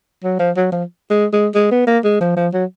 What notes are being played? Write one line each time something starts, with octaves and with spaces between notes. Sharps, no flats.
F#3
F3
F#3
F3
G#3
G#3
G#3
B3
A#3
G#3
F3
F3
F#3